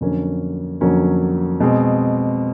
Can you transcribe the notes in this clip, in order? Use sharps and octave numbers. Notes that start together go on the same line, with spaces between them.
F2 D3 F#3 A#3 C#4
F2 D3 F#3 A#3 C#4
B2 G#3 C4